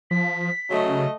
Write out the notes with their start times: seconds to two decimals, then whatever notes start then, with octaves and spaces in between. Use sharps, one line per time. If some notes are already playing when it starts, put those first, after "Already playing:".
0.11 F3 B6
0.70 C#3 F#3 A3 D#5